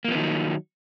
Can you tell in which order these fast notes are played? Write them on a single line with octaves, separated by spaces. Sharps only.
A#3 F3 B3 D#3 F#3